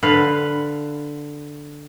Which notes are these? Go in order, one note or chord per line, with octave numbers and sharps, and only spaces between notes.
D3 B4 F5